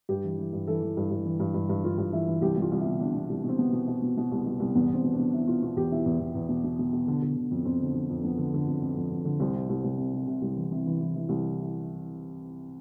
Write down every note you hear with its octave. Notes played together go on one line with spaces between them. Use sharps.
G2 G4
E3
E3
G2
E3 A4
E3
G2
G2
E3
G2
G2
G2
G2 F4
G2
E3 E4
E3
C2 G4
C2
F4
C2
E4
B2
B2 D4
B2
C2
B2
C4
B2 B3
B2
B2
B2
B2
C2
B2
C2
E2 B3
E2 C4
B2
D4
B2
B2 E4
B2 F4
B2 F4
E2 G4
B2 E4
E2
E2
E2
B2
B2
B2
B2
D3
D3
D3
F2
F2 C4
D3
D3
F2
F2 B3
D3
D3
F2
F2
F2
F2
D3
C2 C4
C3
C2
C2
C3
C3
C3
C2
E3
C3
E3
E3
E3
C2